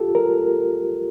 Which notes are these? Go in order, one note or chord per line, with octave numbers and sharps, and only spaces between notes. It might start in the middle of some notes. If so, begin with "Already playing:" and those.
Already playing: F4 G4 A4
A#4